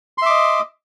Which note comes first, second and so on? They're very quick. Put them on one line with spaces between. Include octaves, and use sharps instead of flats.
C6 E5 D6 D#5